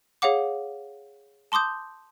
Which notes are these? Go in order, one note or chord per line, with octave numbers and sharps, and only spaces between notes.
G#4 C#5 F5 F#5 D6
A5 C6 D6 D#6 G6